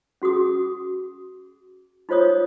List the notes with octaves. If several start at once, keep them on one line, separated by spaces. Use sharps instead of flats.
C#4 F#4 G#4 D#6
D#4 F4 C5 C#5 D#6